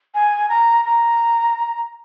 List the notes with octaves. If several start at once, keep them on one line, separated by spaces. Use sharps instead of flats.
G#5
A#5
A#5